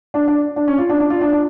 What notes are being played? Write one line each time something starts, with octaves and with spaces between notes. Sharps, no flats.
D4
D4
D4
C#4
F4
D4
D4
F4
D4
D4